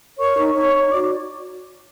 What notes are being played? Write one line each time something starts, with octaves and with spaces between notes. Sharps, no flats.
A#4 C#5 C#6
D#4
D#4 C#5 C#6
D#4
F#4 D5 D6